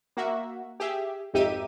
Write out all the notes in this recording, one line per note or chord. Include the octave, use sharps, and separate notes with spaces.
A#3 F#4 E5
G4 G#4 E5
G#1 F2 D#4 G4 E5 D#7